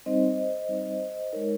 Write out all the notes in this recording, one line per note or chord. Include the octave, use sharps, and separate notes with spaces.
G3 C4 D#4 C5 D#5
G3 C4 D#4
G#3 D#4 A#4 C#5